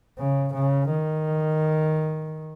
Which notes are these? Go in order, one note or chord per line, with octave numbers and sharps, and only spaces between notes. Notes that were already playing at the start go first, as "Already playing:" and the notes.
C#3
C#3
D#3